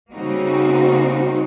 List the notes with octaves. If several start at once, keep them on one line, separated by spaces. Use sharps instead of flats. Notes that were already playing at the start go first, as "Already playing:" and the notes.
C#3 G3 A#3 C4 D#4 F#4